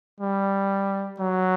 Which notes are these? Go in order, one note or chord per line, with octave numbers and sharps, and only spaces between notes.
G3
F#3